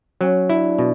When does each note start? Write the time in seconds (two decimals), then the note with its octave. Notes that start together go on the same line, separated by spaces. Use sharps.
0.21 F#3 C#4
0.50 D4 E4
0.79 B2